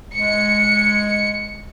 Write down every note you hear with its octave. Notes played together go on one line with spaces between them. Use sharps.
G#3 C#7